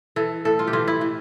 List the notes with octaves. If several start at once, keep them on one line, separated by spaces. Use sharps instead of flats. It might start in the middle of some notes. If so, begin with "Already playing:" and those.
E3 A4
A2 A4
F4
G4
E3 F4
E4
E3